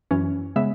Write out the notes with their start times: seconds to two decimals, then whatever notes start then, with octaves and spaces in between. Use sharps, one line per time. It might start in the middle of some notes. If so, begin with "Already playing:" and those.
0.11 F#2 E3 C#4
0.56 C#3 G#3 B3 E5